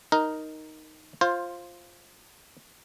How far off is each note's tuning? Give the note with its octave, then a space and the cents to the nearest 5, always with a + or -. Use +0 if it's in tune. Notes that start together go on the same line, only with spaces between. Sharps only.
D#4 +0 A#4 +0
F4 +0 C5 +15